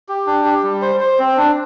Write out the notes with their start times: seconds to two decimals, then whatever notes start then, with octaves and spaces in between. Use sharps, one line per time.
0.09 G4
0.27 D4
0.45 G4
0.63 G3
0.82 C5
1.00 C5
1.19 C4
1.37 D4